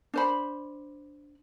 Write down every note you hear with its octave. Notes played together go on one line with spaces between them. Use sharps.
D4 C5 B5